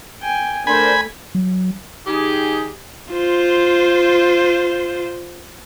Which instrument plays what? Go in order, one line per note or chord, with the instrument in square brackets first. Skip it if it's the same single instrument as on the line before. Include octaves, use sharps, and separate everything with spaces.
[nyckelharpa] G5 G#5
[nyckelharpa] A3 [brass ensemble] D4 A#4 C5 [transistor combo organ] G#5 B5
[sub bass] F#3
[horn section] D#3 D#4 G4 G#4
[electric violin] F4 C5